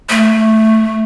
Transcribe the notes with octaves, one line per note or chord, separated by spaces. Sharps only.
A3